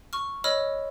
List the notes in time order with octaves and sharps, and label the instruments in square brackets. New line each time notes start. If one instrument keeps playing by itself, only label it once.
[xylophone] C#6 F6
C#5 D#5 B5 E6 F6